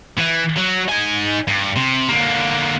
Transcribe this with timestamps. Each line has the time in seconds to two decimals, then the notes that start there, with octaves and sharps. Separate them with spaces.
0.18 E3
0.57 F#3
0.88 D#4 G#5
1.48 G2
1.76 C3
2.09 D3 A#3